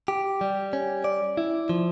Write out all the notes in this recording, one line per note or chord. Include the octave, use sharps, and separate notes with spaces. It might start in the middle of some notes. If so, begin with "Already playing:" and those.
G4
G3
C#4
D5
E4
F3